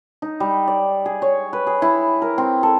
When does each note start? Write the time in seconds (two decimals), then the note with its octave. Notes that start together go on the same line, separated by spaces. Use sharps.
0.22 D#4
0.40 G3
0.68 D5
1.06 G#4
1.22 C#5
1.53 B4
1.67 G#4
1.82 E4
2.22 A#4
2.38 C4
2.63 A4